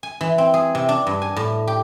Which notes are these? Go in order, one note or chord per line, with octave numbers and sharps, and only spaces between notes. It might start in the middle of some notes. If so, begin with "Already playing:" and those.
G#5
E3
C4
G#4
C3
D4
G2
G#5
A2
G4